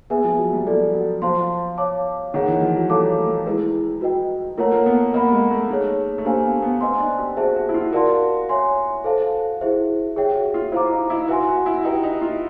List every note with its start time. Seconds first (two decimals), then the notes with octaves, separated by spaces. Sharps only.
0.10 B3 G#4 B4 E5 G#5
0.24 F3
0.38 F#3
0.53 G3
0.66 F3 F4 A4 D5
0.94 F#3
1.22 F3 C5 F5 A5 C6
1.78 C#5 F5 A5 D6
2.34 D#3 D#4 G#4 C#5 F#5
2.48 E3
2.63 F3
2.76 F#3
2.89 G3 A4 C#5 F5 A5 D6
3.18 A3
3.46 G#3 E4 G#4 B4
4.01 F#4 B4 D#5 G5
4.58 A3 F4 A#4 C#5 F#5 A#5
4.72 A#3
4.86 B3
5.13 A#3 A#4 D#5 F#5 B5
5.32 G#3
5.51 A3
5.70 D#4 G#4 C#5
6.18 A3
6.25 A#3 D4 G4 C5 F5 G#5
6.44 B3
6.62 B3
6.81 C4 B4 D#5 G#5 C6
7.00 D4
7.18 G4
7.37 F#4 G#4 C5 E5 A5
7.56 F#4
7.69 E4
7.74 F4
7.93 F#4 A#4 D5 F5 A5 C6
8.49 C#5 E5 G#5 C6
9.04 A4 C5 F5 A5
9.61 E4 G#4 C5 E5
10.16 G4 G#4 C#5 E5 G5
10.35 F#4
10.54 F4
10.72 E4 C5 F5 A#5 D6
10.91 D#4
11.10 E4
11.28 F#4 B4 E5 G#5 C6
11.48 F#4
11.66 E4
11.84 D#4 G4 B4 E5 G5
12.03 D#4
12.21 F4